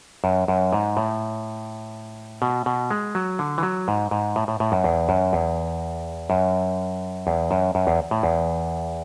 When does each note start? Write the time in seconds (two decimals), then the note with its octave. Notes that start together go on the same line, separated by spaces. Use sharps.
0.24 F#2
0.48 F#2
0.73 G#2
0.97 A2
2.42 B2
2.66 B2
2.91 G#3
3.15 F#3
3.39 D3
3.58 E3
3.63 F#3
3.88 G#2
4.11 G#2
4.36 A2
4.48 A2
4.60 A2
4.72 F#2
4.84 E2
5.09 F#2
5.33 E2
6.30 F#2
7.27 E2
7.51 F#2
7.75 F#2
7.87 E2
8.11 A2
8.23 E2